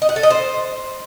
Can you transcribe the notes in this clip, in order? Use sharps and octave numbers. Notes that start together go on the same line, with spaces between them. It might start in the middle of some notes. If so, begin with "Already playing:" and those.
D#5
F#5
A4
D#5
C5